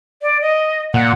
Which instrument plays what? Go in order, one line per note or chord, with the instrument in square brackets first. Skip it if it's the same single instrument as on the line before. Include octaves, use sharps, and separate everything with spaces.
[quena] D5
D#5
[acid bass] A#2 [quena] F#5